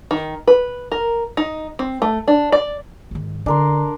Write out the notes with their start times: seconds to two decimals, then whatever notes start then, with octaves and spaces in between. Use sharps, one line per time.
0.11 D#3
0.47 B4
0.92 A#4
1.37 D#4
1.79 C4
2.02 A3
2.28 D4
2.52 D5
3.11 G#2 D#3
3.46 D3 D4 A#4 C6